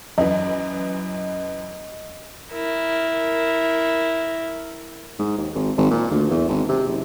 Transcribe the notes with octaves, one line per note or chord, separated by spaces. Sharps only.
F#2 E3 D#5
E4 A#4
G#2
D#2
G#1
G#1
A#2
D2
E2
G#1
C3
F#1